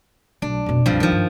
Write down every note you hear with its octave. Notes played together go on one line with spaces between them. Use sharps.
B1 A3 D4
F1 B2
F#1 C2 G2 F3
F2 D#3 F3
G2